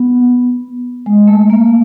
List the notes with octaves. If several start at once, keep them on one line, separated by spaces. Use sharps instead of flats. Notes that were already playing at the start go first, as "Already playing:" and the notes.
Already playing: B3
G#3
A3
A#3